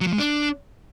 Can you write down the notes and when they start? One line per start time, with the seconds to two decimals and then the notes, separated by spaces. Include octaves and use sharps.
0.01 F#3
0.07 F3
0.13 G#3
0.19 D4